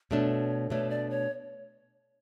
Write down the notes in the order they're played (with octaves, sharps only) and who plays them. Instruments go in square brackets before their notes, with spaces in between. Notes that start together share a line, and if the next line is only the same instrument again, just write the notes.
[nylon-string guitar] B2 A3 D4 [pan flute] C#5
[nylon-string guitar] B2 A3 D4 [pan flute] C#5
[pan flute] D5
C#5